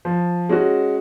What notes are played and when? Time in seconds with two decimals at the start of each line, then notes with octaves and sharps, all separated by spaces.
0.05 F3
0.49 G#3 C#4 F#4